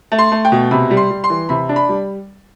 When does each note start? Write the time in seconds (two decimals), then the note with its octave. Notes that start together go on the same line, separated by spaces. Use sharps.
0.12 A3
0.19 C6
0.32 A3
0.45 G5
0.52 B2
0.71 C3 B5
0.91 G3
0.97 C6
1.10 G3
1.24 C6
1.30 E3
1.49 C3 B5
1.69 D4
1.76 B5
1.89 G3